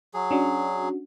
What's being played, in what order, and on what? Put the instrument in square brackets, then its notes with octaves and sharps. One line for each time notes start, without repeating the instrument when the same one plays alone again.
[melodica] F#3 G#4
[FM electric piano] C#4 D4 F#4